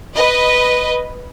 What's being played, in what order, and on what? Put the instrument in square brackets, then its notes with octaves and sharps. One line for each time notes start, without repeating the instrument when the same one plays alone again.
[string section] B4 D#5